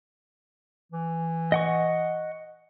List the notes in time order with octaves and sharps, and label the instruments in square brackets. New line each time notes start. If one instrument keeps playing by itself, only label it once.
[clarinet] E3
[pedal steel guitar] D#5 F#5 C#6